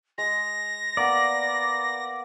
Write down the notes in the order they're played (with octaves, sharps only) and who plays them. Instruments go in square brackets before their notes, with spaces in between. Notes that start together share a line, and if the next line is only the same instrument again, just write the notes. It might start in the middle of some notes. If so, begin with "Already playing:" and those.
[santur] G#3 [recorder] A#6
[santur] A#3 B3 [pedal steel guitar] D5